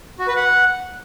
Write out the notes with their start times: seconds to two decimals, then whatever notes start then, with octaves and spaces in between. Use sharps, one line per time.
0.19 F#4
0.28 B4
0.36 F#5